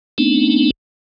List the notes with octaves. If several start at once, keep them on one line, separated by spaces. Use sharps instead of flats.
A3 B3 C4 D4 D#4